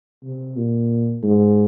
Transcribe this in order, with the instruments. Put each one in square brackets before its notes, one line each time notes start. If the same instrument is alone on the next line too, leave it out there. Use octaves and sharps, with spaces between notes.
[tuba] C3
A#2
G#2